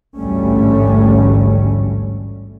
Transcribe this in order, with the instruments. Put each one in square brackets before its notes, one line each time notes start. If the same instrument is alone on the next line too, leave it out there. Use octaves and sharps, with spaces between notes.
[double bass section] A1 D2 G#2 G3 A3 C#4